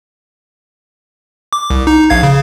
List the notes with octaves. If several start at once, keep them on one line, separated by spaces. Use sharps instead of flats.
D6
C2
D#4
A#1 F5 G#6
C#3